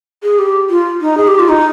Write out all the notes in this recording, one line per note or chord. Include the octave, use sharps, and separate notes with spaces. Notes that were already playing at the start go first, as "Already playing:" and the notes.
G#4
G4
F4
D#4
G#4
G4
F4
D#4